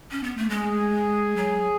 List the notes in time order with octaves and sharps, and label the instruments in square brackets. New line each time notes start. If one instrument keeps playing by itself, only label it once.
[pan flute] C#4
B3
A3
[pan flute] G#3 [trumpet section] G#4
[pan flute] F#3